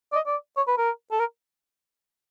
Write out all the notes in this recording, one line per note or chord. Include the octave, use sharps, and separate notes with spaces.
D5
D#5
D5
C#5
B4
A#4
A4
A#4